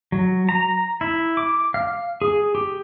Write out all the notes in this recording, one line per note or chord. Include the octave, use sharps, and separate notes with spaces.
F#3
A#5
E4
D6
F5
G#4
G4